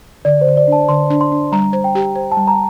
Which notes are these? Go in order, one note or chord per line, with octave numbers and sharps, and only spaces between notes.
D3 D5
C5
D3
D5
D4 A5
D3 C6
D4
C6
D4
G3 A#5
C5
G5
G4
C5
A5
G3
A#5